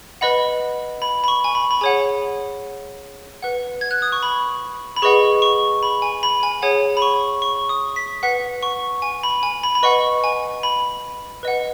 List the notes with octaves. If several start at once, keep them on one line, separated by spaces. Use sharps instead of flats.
B4 D#5 F#5 B5
B5
B5
C#6
G#5
B5
B5
G#4 C#5 F#5 G#5
B4 F#5
G#6
F#6
D#6
C#6
B5
B5
G#4 B4 D#5 F#5 C#6
C#6
B5
G#5
B5
G#5
G#4 C#5 F#5 G#5
B5
C#6
C#6
D#6
B6
B4 F#5 B6
C#6
G#5
B5
G#5
B5
B5
B4 D#5 F#5 C#6
G#5
B5
B4 D#5 F#5